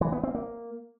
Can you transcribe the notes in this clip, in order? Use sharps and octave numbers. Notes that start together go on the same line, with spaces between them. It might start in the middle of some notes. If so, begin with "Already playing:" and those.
E3
B3
C4
A#3